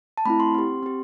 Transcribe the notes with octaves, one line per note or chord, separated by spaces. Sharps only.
A5
A3 C4 E4 B5
C6
C4 G4
C4 G4